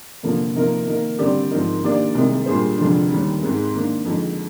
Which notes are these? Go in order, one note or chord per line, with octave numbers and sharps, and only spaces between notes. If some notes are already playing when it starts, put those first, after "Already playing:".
F1 F2 D3 F3 A#3
C3 F3 A#3 D#4 A#4
D#3 A#3 D#4 A#4
D3 G3 C4 G4 D5
G#2 F3 C4 D#4 A#4
D#3 A#3 D4 G4 D5
C2 C3 D#3 G#3 D#4
A#2 G3 D4 G#4 C5
F1 F2 D3 G#3 D4
D#2 D#3 G3
G#2 D#3 G#3 C4
D#3 A#3 D4
F2 D3 G#3 D#4